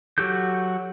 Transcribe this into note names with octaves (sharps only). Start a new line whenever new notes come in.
F#3 F#4 G4 A4 G6